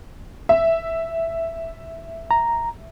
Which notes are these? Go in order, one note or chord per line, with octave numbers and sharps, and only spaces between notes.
E5
A#5